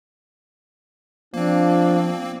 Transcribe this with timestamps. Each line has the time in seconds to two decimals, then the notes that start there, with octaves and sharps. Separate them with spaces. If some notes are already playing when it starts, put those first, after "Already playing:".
1.34 F3 A#3 C4 D4